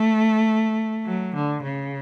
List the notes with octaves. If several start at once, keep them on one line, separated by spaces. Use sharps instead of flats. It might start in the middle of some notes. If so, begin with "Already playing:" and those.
Already playing: A3
F#3
D3
C#3